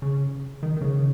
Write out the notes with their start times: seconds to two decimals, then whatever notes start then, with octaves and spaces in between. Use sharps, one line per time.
0.02 C#3
0.63 D#3
0.77 D#3
0.81 C#3